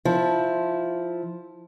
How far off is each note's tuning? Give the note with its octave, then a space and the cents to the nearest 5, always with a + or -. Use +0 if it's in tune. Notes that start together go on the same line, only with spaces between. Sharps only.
F3 +0 E4 -10